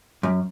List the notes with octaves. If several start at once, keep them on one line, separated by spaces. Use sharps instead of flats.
F#2